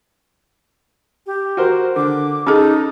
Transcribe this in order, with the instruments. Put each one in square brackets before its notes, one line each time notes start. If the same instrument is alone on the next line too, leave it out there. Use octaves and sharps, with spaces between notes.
[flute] G4
[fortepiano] F#4 A#4 C5
[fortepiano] D3 [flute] D6
[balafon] C#4 G#4 [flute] D#4 [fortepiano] A4